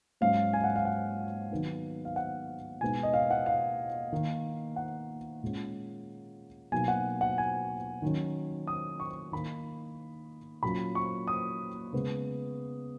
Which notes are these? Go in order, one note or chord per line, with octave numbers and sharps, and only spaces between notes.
G#2 F#3 C#4 F5
G#5
F#5
F5
F#5
D#3 F#3 B3 D#4
F5
F#5
B2 G#3 B3 D#4 G#5
D#5
F5
F#5
F5
D#3 A#3 D#4
F#5
A#2 G#3 C#4
B2 F#3 A#3 D#4 G#5
F#5
F#5
G#5
D#3 F#3 C#4
D#6
C#6
D#3 A#3 D#4 B5
A#2 F#3 A#3 C#4 B5
C#6
D#6
C#3 G#3 B3